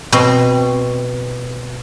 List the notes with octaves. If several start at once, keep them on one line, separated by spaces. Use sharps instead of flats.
B2 C4